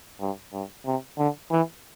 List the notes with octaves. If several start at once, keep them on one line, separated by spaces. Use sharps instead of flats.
G2
G2
C3
D3
E3